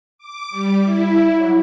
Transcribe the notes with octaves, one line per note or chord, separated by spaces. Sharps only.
D6
G3
E4
F#3